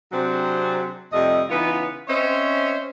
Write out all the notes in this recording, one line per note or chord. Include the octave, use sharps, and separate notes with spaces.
C3 F#3 C4 D4 G#4 C5
F2 C3 G3 A3 D#5
C#3 E3 B3 D#4 F4 B4
C4 C#4 C5 C#5 D#5 E5